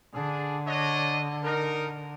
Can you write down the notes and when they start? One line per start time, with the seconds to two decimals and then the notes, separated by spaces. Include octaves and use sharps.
0.14 D3 D4 G#4
0.67 D4 C#5 D#5
1.43 D#4 A#4